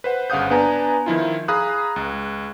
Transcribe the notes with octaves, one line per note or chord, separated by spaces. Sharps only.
B4 C5 F#5
G1 C#3 F5 F#5 D#6 G6
B3 D4 B4 G#5 A#5
D#3 F3 E4 F4
G#4 F5 A#5 B5 D#6 F#6
C#2